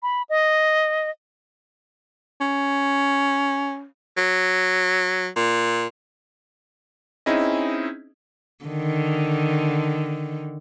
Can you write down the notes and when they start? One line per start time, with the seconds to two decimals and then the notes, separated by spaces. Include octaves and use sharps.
0.03 B5
0.29 D#5
2.41 C#4
4.18 F#3
5.36 A#2
7.26 C4 C#4 D#4 E4 G#4 D#5
8.65 D3 D#3